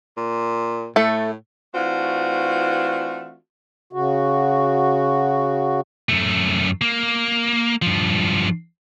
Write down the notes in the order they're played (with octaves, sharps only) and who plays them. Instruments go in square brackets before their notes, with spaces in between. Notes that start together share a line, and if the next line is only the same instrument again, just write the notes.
[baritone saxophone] A#2
[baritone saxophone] A2 [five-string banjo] A3 A4
[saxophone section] E3 A3 C4 D4 F4 F#4
[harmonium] C#3 F#4
[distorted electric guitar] F#2 A3
A#3
G2 F3